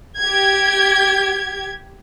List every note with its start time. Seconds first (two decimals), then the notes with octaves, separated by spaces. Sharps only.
0.19 G4 G#6